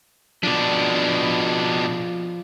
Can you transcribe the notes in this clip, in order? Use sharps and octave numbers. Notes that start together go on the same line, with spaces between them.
B2 F3 D4 D5